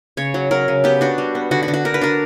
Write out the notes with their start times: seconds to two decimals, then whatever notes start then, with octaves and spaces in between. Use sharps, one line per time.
0.17 C#3 C#5
0.34 F#3
0.51 F#3 A#4
0.68 C#3
0.84 B3 G4
1.01 D4 F#4
1.18 G3
1.35 B3
1.51 D3 F#4
1.63 F#4
1.68 D3
1.74 F#4
1.85 D3 A#4
1.94 B4
2.01 D4 A#4